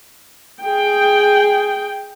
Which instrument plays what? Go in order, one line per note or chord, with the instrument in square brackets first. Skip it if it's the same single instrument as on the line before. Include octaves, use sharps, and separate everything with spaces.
[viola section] G#4 G5